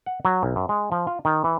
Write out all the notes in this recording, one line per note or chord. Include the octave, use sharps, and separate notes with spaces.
F#5
F#3
B1
F#2
G#3
F3
F4
D#3
E3